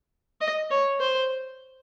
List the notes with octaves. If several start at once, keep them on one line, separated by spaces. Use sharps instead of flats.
D#5
C#5
C5